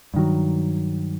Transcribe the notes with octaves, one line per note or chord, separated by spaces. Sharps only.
G2 D#3 F#3